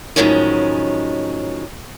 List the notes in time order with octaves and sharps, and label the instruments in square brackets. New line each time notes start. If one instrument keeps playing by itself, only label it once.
[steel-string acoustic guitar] A2 D#3 F3 F#3 G#3 C#4